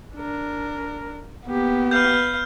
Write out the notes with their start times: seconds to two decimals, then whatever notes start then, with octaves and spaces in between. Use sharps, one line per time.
0.15 D4 A#4
1.47 A#3 B3 G4
1.91 B4 F5 F6 G6